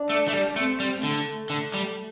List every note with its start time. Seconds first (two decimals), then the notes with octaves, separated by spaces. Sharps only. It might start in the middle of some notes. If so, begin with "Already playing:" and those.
Already playing: D4
0.10 A3
0.28 A3
0.33 G3
0.56 A3 C4
0.80 G3
1.03 D3 A3
1.50 D3
1.74 G3